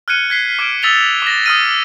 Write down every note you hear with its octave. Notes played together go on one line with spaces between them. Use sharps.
F6 F#6 G#6 C#7 D#7
G#6 B6 C7
D6 F6 G#6 D7
D#6 E6 A6 B6 F7 G7
D6 A#6
D#6 F6 D#7